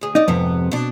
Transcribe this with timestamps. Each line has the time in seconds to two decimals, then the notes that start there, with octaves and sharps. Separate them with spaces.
0.01 D2 G#4
0.15 D#4 D5 D#5
0.28 F2 G#2 C3 B3
0.71 B2 D4